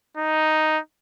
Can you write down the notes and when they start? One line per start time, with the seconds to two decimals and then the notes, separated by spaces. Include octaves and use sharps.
0.18 D#4